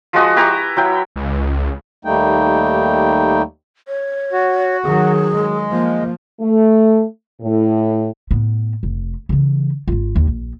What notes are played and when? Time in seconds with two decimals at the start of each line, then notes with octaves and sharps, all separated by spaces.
0.13 F3 G#3 F#4 D#6
0.36 E4 G4 B4 A#5
0.76 F#3 E4 G5
1.16 C#2
2.05 D#2 G3 A3 A#3 D#4 G5
3.88 C#5
4.32 F#4
4.84 D#3 F#3 G#4
5.32 G#3
5.71 F3 A#3
6.40 A3
7.41 A2
8.31 A2 B3
8.83 F1
9.29 C#3 E3
9.88 G#1 F4
10.16 D#2
10.27 A#1